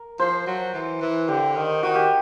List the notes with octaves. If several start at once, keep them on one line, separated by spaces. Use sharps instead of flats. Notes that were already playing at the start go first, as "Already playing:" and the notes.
Already playing: A#4
F3 C5
F#3
E3
E3
D3 G4
D#3
D#3 F#4
G4